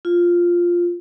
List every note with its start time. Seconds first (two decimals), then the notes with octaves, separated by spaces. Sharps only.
0.05 F4